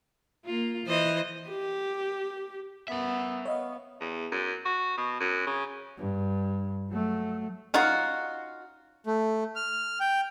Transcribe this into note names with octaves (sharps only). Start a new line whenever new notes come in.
A#3 F4
E3 C5 D#5
G4
B3 A#4 E5
B3 C#5 D#5 F5
E2
F#2
F#4
B2
F#2
C#3
G2
F#3 A3
C#4 D#4 F4 F#4
A3
F6
G5